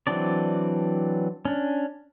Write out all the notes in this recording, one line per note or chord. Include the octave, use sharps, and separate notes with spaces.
E3 F#3 C4 D4 D5
C#4 D4